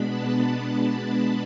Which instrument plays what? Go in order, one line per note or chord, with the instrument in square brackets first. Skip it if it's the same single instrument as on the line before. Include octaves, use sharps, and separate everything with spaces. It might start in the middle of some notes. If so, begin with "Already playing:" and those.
Already playing: [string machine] B2 G#3 B3 D4 B5
A5